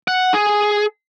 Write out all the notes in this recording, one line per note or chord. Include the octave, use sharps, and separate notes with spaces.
F#5
G#4